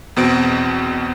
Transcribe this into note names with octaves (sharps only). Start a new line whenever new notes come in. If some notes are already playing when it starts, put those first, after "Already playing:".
E2 B2 C4 D7